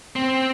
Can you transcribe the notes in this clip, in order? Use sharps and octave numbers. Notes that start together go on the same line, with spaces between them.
C4